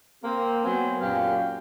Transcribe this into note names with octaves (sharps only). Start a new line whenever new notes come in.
A#3 C4
F#3 B3 C4 C5 G#5
F#2 A#2 G4 F5